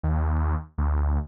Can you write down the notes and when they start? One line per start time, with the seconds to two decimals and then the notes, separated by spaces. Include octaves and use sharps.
0.03 D#2
0.78 D2